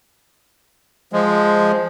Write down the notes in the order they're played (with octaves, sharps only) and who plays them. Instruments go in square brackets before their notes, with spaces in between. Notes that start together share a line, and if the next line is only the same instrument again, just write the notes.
[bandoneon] F3 G#3